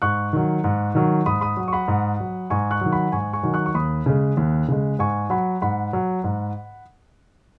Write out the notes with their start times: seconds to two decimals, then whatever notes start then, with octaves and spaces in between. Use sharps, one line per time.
0.02 G#2 C#6 F#6
0.33 D#3 F#3
0.64 G#2
0.95 D#3 F#3
1.26 G#2 B5 D#6
1.41 B5 D#6
1.57 F#3
1.68 C#6
1.73 F#5 B5
1.88 G#2
2.20 F#3
2.50 G#2 G#5 C#6
2.71 C#6 F#6
2.81 D#3 F#3
2.92 F#5 B5
3.12 G#2 G#5 C#6
3.33 G#5 C#6
3.43 D#3 F#3
3.54 C#6 F#6
3.66 C#6
3.74 D#2 B5 D#6
4.06 C#3 G#3
4.37 D#2
4.68 C#3 G#3
4.99 G#2 G#5 C#6
5.30 F#3 F#5 B5
5.62 G#2 F#5 B5
5.93 F#3
6.24 G#2